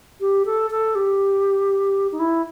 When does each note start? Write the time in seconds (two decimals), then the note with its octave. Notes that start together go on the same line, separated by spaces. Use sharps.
0.21 G4
0.45 A4
0.71 A4
0.95 G4
2.12 D#4
2.19 E4